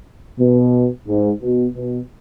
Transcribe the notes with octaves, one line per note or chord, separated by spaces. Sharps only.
B2
G#2
B2
B2